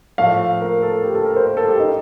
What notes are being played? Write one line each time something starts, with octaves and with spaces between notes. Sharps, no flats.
A2 F3 A3 F5
A#4
A4
G4
A4
A#4
C5
A#4
A4
G4
D#4